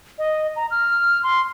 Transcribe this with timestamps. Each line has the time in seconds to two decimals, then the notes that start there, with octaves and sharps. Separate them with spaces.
0.18 D#5
0.56 A#5
0.71 F6
1.23 C6